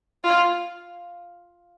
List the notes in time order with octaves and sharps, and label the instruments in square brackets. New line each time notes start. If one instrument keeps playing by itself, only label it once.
[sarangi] F4